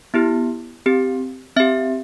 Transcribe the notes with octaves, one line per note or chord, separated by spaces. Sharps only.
B3 E4 G4
C4 G4
C4 G4 E5